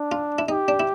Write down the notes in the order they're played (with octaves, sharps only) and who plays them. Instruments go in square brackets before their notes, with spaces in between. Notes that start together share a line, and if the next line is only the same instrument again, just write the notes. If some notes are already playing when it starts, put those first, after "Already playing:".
Already playing: [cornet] D4
[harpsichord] F4
E4
[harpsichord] D#4 [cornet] G4
[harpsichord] D4
E4